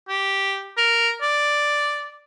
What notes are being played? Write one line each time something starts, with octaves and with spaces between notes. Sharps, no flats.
G4
A#4
D5